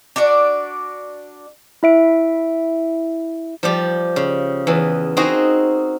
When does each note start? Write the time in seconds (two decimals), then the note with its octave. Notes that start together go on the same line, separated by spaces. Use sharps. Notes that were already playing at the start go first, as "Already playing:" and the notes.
0.16 D4 F#4 D5
1.83 E4 E5 D7
3.63 F3 G3 G4
4.16 C#3
4.67 E2 E3
5.17 C4 D#4 F#4 G#4 A#4